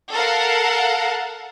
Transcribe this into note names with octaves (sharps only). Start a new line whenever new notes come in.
A4 A#4 F5 F#5